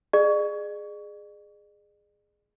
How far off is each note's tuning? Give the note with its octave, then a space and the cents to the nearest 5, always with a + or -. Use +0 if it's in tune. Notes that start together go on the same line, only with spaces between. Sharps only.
G#4 +0 D5 +40